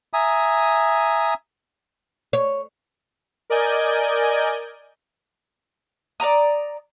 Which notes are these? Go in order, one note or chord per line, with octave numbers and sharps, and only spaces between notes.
E5 G#5 A#5 D#6
C#5
A#4 D5 D#5 G#5 G6
D5 D#5 A#5 D#6